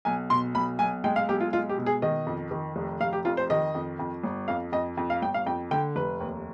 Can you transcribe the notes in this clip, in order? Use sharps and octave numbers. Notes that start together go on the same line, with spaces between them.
B1 G#5
B2 C6
B1 B5
B1 G#5
G#3 G5
F5
B1 G4
F4
G#3 F4
G4
B2
G#4
D#3 D#5
F2
D#3
F1
F1 F5
G4
F2 F4
C5
D#3 D#5
F2
F2
G1
F2 F5
F2 D#5
F2
F5
G1 G5
F5
F2 G5
D3 G5
F1 B4
D#2